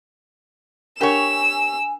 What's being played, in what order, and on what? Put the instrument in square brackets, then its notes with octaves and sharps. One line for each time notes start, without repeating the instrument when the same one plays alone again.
[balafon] D4 A#4 F#5 [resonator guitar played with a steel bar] G4 C#5 [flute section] G#5 [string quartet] E6